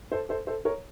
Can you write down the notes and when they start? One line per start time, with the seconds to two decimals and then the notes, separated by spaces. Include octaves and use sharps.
0.12 A4 C5
0.29 A4 C5
0.47 A4 C5
0.65 A#4 C#5